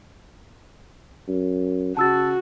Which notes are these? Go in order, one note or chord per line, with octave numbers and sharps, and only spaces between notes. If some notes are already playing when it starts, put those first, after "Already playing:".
F#2
C#3 F#4 A5 E6 A6